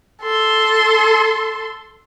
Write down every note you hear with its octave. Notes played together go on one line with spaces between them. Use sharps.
A4 C6